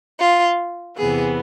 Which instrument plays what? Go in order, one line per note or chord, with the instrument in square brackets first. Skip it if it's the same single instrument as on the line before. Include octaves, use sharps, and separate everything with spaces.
[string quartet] F4
E2 C3 E3 B3 G#4